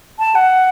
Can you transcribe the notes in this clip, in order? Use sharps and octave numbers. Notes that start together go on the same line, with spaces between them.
A5
F#5